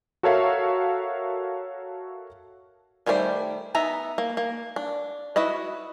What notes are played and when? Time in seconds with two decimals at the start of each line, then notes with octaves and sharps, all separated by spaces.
0.23 F#4 A4 A#4 C#5 E5 F5
3.06 D#3 G3 A3 C5 D5
3.75 B3 D#4 E5 A#5
4.18 A#3
4.37 A#3
4.76 D4
5.36 E4 F#4 B4 D#5